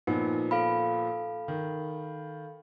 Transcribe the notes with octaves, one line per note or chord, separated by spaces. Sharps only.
A#2 F3 B3 D#4
A4 F5 B5
D#3